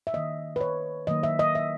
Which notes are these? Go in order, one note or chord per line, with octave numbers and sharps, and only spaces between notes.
E5
D#3 A#3 D#5
B4
C#5
D#3 F#3 A#3 D#5
E5
D#5
E5